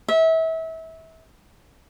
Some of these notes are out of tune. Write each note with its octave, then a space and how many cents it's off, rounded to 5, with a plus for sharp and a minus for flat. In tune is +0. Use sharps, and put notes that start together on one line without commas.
E5 -30